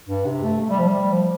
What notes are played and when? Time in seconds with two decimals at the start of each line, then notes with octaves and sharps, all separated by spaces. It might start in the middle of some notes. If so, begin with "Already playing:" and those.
0.09 G2
0.26 C3
0.43 A3
0.61 A3
0.70 G3
0.79 F3
0.88 G3
1.13 F3